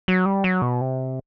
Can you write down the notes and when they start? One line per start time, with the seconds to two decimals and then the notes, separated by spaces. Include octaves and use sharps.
0.08 F#3
0.26 G3
0.44 F#3
0.62 B2
0.81 C3